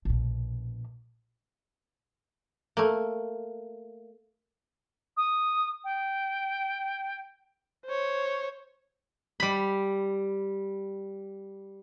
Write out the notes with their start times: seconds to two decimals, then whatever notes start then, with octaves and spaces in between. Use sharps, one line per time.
0.05 A#1 B2
2.77 A3 A#3
5.17 D#6
5.84 G5
7.85 C5 C#5
9.40 G3 B5